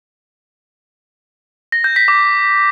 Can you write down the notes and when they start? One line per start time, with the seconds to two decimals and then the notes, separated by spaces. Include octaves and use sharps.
1.72 A#6
1.84 G6
1.96 B6
2.08 D6